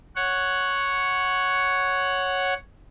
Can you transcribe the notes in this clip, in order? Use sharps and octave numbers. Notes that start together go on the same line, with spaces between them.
C#5 F#5